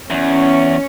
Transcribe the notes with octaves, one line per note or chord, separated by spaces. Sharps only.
E2 C#4